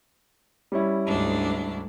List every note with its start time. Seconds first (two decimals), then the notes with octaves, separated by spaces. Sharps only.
0.72 G3 C#4 E4
1.04 D2 G#2 D4